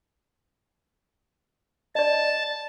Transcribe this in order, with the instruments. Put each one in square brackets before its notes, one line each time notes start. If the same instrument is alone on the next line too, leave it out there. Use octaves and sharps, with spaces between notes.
[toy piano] D5 D#5 [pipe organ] A5